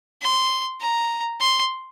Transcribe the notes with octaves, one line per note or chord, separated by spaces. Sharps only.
C6
A#5
C6